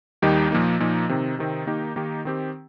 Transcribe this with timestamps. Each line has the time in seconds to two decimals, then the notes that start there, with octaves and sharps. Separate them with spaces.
0.22 D#2 D#3 G3 D#4 G4
0.51 A#2 F3 A#3 D#4
0.80 A#2 F3 A#3 D#4
1.09 C3 D#3 C4 D#4
1.39 C3 D#3 C4 D#4
1.67 D#3 A#3 D#4 G4
1.96 D#3 A#3 D#4 G4
2.25 D#3 C4 G4